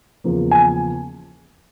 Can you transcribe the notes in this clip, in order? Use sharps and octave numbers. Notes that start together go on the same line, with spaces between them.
E2 C#3 F3 A#3
G#5